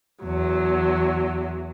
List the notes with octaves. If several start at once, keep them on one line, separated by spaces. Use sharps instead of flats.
E2 F#3